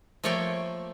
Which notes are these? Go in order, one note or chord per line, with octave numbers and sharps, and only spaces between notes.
F3 A3 A#3 C#5 D5 G5